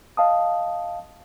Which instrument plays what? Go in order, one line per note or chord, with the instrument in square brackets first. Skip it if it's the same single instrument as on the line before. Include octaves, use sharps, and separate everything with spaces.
[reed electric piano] D#5 F5 A5 D#6